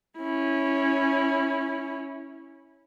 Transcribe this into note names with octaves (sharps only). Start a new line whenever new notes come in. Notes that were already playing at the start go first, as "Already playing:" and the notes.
C#4 E4